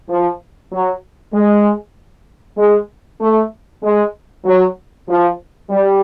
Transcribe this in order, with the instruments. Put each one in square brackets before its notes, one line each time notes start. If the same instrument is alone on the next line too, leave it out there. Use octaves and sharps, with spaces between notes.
[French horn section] F3
F#3
G#3
G#3
A3
G#3
F#3
F3
G3